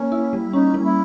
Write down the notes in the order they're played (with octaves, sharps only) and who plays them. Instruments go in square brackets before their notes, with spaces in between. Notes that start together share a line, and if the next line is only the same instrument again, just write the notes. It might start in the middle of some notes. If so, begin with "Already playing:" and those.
Already playing: [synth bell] A#3 [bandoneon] C#4
[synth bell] E4
G3
[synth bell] C#4 [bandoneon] D#4
[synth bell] A#3
[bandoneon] E4